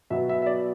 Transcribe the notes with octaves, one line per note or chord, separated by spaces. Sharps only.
B2 F#3 B3 E5
E5
E5
D5